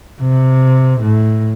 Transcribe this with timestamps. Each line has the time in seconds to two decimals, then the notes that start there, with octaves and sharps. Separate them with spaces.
0.21 C3
1.02 A2